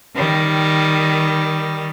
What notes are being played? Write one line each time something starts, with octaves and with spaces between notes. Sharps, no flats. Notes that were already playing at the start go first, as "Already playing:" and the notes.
D#3 G3